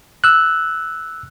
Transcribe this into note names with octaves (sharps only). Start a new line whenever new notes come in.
E6 F#6